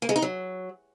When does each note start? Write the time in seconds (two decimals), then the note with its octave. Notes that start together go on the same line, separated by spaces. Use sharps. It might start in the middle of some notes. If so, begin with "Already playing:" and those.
0.02 A#3
0.09 G#3
0.16 D#4
0.22 F#3